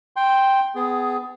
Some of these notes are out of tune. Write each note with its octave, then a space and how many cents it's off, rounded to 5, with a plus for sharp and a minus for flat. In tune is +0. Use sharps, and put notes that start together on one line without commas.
G5 +0 C6 +5
B3 +30 G#4 +0